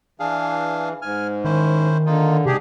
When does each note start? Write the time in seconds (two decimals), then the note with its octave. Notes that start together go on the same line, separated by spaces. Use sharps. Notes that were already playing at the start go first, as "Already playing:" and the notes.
0.20 E3 D4 G#4 F5
1.02 G#2 G#5 F6
1.44 D#3 C#4 E4 C5
2.06 D3 A#3 D#4 F4
2.46 G#2 C3 D4 G4 G#4